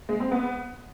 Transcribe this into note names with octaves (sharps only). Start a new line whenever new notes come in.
G#3
C4
B3